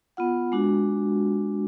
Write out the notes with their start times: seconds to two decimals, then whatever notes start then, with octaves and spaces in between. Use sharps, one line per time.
0.17 B3 F4 F#5
0.52 G#3 D4 F#4